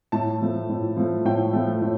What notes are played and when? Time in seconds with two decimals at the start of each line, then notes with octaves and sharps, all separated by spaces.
0.12 A2 A5
0.41 F3 A3
0.69 A2
0.96 F3 A3
1.25 A2 G5
1.53 F3 A3
1.82 A2